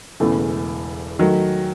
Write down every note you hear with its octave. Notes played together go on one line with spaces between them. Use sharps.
E1 E2 C#3 E3 A3
D#3 F#3 A3